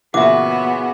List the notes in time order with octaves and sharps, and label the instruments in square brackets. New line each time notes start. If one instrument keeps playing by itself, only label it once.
[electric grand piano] A#2 C#3 E3 [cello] B3 F#4 [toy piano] E5 F#5 [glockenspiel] D6